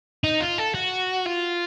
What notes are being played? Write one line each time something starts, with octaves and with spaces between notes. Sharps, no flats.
D#4
F4
A4
F#4
F4